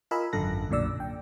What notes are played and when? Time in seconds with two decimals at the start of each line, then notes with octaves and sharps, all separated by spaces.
0.11 F4 A#4 D#5 G#5 B5 E6
0.33 G#1 F#2 D3 A4 F#6 A#6
0.69 B1 F#2 A#2 D3 D5 E6
1.00 G5